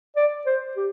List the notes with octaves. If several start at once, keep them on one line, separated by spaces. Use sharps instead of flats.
D5
C5
G4